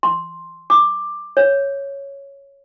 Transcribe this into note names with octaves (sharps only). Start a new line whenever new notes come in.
C6
D6
C#5